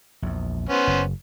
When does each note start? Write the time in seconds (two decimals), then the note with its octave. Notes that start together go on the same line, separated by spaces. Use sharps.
0.22 A#1 E2
0.69 B3 C#4 C5
0.87 F#1